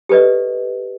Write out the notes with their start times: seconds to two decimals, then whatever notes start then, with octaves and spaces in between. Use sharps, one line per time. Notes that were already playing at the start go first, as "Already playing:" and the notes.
0.09 G4 A4 B4 D5 D#5